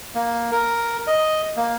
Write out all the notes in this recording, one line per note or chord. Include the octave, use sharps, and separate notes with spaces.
A#3
A#4
D#5
A#3